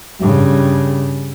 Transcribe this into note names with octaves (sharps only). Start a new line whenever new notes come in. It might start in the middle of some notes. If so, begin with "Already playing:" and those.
G2 C#3